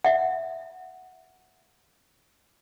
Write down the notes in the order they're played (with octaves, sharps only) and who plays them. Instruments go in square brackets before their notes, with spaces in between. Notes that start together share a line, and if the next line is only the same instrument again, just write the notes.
[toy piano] E5 F#5